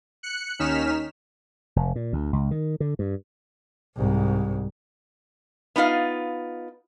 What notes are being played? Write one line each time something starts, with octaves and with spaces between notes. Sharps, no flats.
F#6 C#7
D#2 C#4 D#4 F6 B6 E7
F1
A#2
D2
C#2
D#3
D3
G2
C2 G#2
B3 D#4 F4 F5